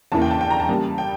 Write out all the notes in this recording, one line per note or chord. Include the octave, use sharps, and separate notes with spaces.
E2 C#3 E3 A#3 A5
G5
A5
G5
A#5
A5
C#3 G3 A#3
G5